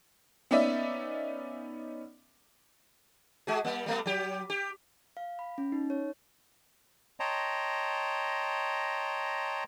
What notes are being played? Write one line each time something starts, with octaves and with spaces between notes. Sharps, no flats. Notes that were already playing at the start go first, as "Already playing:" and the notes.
B3 C#4 D#4 D5 E5
G#3 F#4 G#4
G3 A#3
G3 A3 B3
F#3 G4
G4
F5
B5
C#4
D#4
C#5
C#5 D#5 G5 A5 A#5 C6